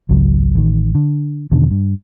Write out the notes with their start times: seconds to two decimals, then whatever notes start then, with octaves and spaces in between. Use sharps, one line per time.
0.09 G#1 C#2 C#3 F#3
0.55 A1 D#3
0.95 D3
1.52 E2 B2 D3 D#3
1.71 G2